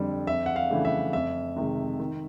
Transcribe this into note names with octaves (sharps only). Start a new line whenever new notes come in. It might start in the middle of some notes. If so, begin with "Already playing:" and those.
Already playing: F2 D3 G3
F2 E5
F#5
F5
C#3 E3 A3 D4
E5
F2 E5
C3 D#3 G#3
D#3